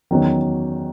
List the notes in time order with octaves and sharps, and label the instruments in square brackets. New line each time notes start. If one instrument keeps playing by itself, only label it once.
[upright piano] E2 D#3 F#3 C#4 F#4